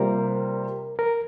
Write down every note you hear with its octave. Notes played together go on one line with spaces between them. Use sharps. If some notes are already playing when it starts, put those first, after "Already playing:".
Already playing: C3 G3 A#3 F4 A#4 C5
A#4